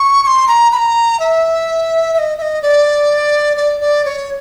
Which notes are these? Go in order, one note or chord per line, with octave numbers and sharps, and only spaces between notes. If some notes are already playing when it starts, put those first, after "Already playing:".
Already playing: C#6
C#6
C6
A#5
B5
A#5
E5
E5
D#5
E5
D#5
D5
D5
D5
C#5